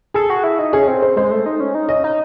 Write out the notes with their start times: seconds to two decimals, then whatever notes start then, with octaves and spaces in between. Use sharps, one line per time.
0.14 G#4 A4
0.30 F#4
0.44 E4
0.59 D#4
0.73 C#4 G#4
0.87 C4
1.02 C5
1.16 G#3 C5
1.31 A3
1.46 D#4
1.60 C#4
1.75 D#4
1.89 C#4 D#5
2.04 D#4